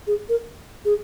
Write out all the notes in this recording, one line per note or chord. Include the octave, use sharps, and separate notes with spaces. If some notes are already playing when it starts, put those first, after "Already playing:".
G#4
A#4
G#4